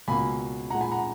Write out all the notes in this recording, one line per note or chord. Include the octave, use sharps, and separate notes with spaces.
C#2 B2 A#3 G#5 B5
A#2 G#3 F#5 A#5
G#5 B5
F#5 A#5